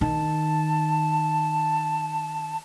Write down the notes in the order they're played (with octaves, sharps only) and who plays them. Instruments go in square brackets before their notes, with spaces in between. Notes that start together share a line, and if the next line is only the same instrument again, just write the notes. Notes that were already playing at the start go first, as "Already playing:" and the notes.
[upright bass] D#3 [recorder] A5